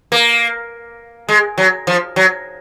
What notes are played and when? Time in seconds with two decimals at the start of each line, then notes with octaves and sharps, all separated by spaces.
0.12 A#3
1.29 G#3
1.58 F#3
1.87 F3
2.16 F#3